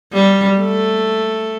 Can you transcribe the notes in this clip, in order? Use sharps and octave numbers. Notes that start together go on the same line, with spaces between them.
G3
A3